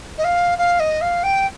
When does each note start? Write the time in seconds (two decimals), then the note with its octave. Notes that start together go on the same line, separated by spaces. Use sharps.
0.18 D#5
0.24 F5
0.58 F5
0.80 D#5
1.01 F5
1.23 G5